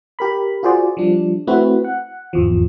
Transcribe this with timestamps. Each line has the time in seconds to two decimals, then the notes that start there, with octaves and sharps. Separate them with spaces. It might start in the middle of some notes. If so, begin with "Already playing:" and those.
0.19 G4 A#4 B5
0.63 F4 F#4 G#4 C5 D5
0.97 F3 G3 D4
1.47 A3 C4 E4 F#4 B4
1.84 F#5
2.33 G#1 E2 F3